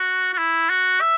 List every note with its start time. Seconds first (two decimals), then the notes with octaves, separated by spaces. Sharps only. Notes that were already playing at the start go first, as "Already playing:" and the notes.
Already playing: F#4
0.33 F#4
0.38 E4
0.70 F#4
1.01 E5